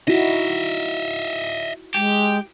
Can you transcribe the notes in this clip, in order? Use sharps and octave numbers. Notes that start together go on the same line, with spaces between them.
D#4 E4 F#4 D#5 E5
G#3 G4